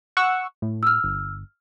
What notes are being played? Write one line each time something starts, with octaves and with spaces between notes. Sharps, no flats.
F#5 C#6 E6
A2
E6 F6
G1